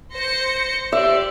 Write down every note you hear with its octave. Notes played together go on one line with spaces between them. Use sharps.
C5 A#6 C#7
G4 C5 D5 E5